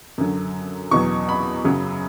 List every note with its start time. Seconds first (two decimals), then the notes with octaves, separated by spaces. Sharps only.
0.18 F#2 D3 F#3
0.91 E2 B2 F#3 C#6
1.29 B5
1.65 F#2 C#3 F#3